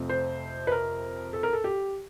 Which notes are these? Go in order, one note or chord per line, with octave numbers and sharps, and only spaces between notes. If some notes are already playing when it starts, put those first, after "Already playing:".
Already playing: F2 C3 F3 A3 C4
C5
B4
A#4
A4
A#4
A4
G4